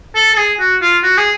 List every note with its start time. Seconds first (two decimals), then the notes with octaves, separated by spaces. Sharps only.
0.15 A4
0.33 A4
0.37 G#4
0.59 F#4
0.82 F4
1.03 F#4
1.17 G#4